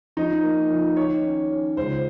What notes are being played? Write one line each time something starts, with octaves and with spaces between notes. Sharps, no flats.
F3 D#4
A#3
F3
D#3 C#5
C#4
C#4
C#2 C5